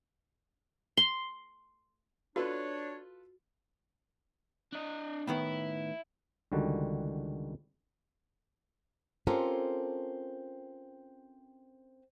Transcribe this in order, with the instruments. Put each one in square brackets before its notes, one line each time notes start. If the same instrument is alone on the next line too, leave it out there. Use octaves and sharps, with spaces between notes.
[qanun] C6
[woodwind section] D4 C#5 [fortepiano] F4 A4 B4 [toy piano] F#4
[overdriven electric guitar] D4 D#5
[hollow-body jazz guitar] A2 D#3 B3 [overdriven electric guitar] E4
[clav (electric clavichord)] C#2 D3 D#3 G3 F#4
[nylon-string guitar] C4 C#4 F4 G4 A4 A#4